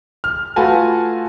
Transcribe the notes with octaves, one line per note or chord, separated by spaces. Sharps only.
F6
A3 F4 F#4 B4 G#5 A5